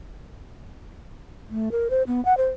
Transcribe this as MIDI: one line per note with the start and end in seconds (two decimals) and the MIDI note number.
1.50 1.69 57
1.72 1.88 70
1.90 2.03 72
2.07 2.23 59
2.25 2.37 78
2.37 2.48 72